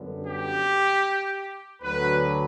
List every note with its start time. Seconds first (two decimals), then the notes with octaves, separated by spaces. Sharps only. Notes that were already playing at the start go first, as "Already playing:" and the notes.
Already playing: F#2 D3 G3 B3
0.26 G4
1.82 D2 D3 F#3 B4